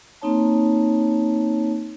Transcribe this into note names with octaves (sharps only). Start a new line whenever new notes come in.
A#3 C4 D#4 C#5 A5